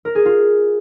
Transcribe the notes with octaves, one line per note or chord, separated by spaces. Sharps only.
A#4
G#4
F4